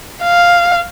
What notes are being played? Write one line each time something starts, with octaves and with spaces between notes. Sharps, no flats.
F5